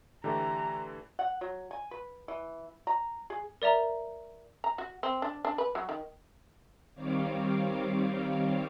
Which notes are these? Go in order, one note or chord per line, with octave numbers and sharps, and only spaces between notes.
D3 E3 A3 G4 A#5
F#5
F#3
G#5
B4
E3
A#5
G#4
A#4 D5 E5 A#5
A#5
F#4
C4
D4
D4
B4
F#3
D#3
D#3 G3 C4 C#5 F5 D6